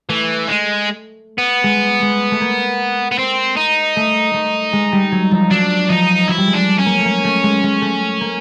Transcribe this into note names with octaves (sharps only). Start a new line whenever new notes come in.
E3 A3
G#3
B3
G#3
G#3
A3
A#3
B3
C4
D#4
A3
A3
G#3
G3
F#3
F3
F#3 D4
F3 D#4
F#3 E4
G3
G#3
D4
C#4
A#3
A3
A#3
A3
G#3
G#3
A3
A#3